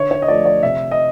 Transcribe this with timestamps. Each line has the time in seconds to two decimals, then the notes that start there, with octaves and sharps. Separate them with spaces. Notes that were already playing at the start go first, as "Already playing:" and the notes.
Already playing: D3 C#5
0.11 C#5
0.22 D#5
0.28 F3 A3 D5
0.45 D5
0.63 C3 E5
0.91 D#5